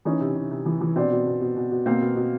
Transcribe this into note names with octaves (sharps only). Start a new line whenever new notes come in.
E3 C#4 D#4
C3
C3
C3
E3
E3
B2 C4 D4
B2
B2
B2
B2
B2
B2 A#3 C4
B2
B2